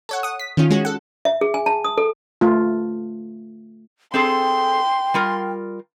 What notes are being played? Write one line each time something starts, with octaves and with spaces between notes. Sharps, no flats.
A4 C#5 F#5
F#5 D#6
B6
D#3 C#4 F4
G#3 C#4 F#4
A4 F#5
E5
G#4
G#5
A5
D#6
A4
A3 F4
C4 G#4 A4 G5 C6
G3 F4 A#4